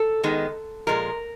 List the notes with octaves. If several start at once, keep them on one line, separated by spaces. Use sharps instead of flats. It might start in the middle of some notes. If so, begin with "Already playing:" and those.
Already playing: A4
D#3 G#3 B3
A#2 F3 G#3 A#4